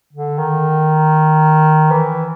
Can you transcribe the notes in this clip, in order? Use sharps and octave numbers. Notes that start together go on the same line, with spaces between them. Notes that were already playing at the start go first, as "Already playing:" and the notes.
D3
D#3
E3